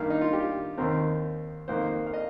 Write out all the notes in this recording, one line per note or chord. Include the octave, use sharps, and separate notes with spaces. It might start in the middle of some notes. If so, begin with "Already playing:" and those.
Already playing: G2 D#3 A#3 F5
D#4
F4
G4
D#2 D#3 C4 A#4
F2 D#3 A#3 C5
F5
D#5